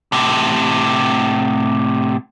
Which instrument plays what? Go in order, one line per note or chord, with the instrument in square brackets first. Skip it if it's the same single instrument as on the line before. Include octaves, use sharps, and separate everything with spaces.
[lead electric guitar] A2 C3